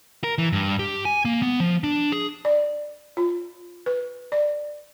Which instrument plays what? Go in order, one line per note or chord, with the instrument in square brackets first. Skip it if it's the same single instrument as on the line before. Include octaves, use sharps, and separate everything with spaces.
[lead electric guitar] A#4
E3
G2
G4
G#5
A#3
B3
F3
D4
G#4
[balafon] D5
F4
B4
D5